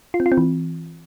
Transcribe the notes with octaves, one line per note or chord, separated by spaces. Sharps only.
F4
C4
F4
C4
E3